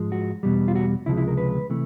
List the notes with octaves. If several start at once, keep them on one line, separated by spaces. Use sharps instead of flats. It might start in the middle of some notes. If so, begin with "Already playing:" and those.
Already playing: G#2 F3 G#3
F#4
E2 B2 G3
F4
F#4
C#2 C3 F3 G#3 E4
E4
A#4
B4
C3 E3 A3